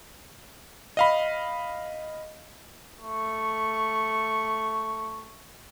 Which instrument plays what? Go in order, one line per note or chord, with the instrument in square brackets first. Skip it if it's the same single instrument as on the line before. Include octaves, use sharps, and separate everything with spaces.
[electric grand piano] D#5 F5 B5
[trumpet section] A3 C#6